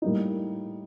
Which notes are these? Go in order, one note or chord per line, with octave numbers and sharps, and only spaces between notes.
A2 G3 A#3 D#4